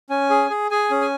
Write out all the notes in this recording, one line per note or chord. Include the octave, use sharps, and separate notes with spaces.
C#4 G#5
G#4
G#4
G#4 G#5
C#4
G#5